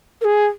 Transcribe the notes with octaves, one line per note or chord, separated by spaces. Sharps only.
A#4
G#4